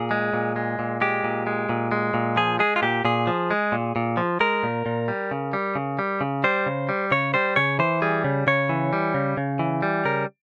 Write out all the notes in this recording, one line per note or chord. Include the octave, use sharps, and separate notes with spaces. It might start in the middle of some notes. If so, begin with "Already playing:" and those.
Already playing: A#2 G#4
G#3
A#2
G#3
A#2
G#3 G4
A#2
G#3
A#2
G#3
A#2
F3 G#4
G#3 G#4
F4
A#2 G4
A#2 G#4
F3
G#3
A#2
A#2
F3
G#3 A#4
A#2
A#2
G3
C#3
G3
C#3
G3
C#3
G3 C5
C#3
G3
C#3 C#5
G3 C5
C#3 C#5
E3 C5
G3 G#4
C#3
C#3 C#5
E3
G3
C#3
C#3
E3
G3
C#3 A#4